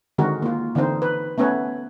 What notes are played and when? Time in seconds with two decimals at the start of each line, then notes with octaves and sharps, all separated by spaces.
0.18 D3 D#3 G#3 C4 F#4 A#4
0.42 A#3 F4
0.75 D3 E3 C4 D#4 C5
1.02 B4
1.38 A3 B3 C#4 B4 C#5